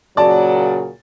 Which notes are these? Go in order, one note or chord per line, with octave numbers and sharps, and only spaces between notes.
A#2 C#3 F#3 D5 A5